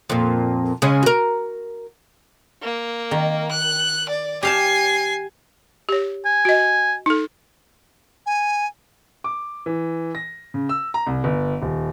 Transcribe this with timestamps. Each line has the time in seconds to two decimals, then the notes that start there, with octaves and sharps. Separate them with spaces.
0.10 F2 A#2
0.82 C#3 G#3 C#4
1.03 F#4 A#4
2.63 A#3
3.11 D#3
3.51 F#6
4.09 D5
4.43 G4 F5 G#5 A5 C7
5.89 G4 C#5
6.25 G#5
6.45 F#4 D#5
7.06 D#4 A4
8.26 G#5
9.24 D6
9.66 E3
10.15 A#6
10.54 C#3
10.69 E6
10.94 A#5
11.07 C2
11.24 G1
11.62 D#1